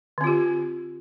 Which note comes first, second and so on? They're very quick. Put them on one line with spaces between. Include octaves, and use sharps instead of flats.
D3 C4 F4 G4